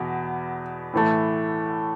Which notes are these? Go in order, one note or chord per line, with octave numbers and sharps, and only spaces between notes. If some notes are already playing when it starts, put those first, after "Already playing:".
Already playing: E2 B2
A2 E3 A3